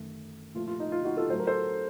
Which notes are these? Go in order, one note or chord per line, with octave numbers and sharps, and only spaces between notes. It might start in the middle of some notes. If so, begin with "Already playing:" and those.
Already playing: F#2 D#3 A3
A#2 F3 A3 F4
F4
D#4
F4
D#4 F#4
F4 A4
A2 F#3 A3 C5
A#4
A4 C5